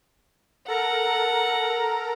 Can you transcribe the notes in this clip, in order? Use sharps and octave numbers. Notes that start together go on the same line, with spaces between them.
A4 A#4 F#5 A#5